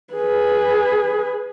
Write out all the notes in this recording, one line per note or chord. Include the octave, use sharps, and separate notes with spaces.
G#4 B4